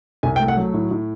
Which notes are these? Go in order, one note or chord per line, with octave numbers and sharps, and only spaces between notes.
C2 G#5
G5
A3
F#5
F#3
A2
A2